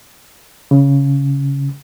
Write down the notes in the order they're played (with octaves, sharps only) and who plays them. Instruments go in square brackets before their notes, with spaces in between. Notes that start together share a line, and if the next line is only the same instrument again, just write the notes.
[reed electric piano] C#3